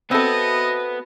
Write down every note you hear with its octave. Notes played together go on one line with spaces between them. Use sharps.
B3 C4 F#4 A4 D#5 E5 B5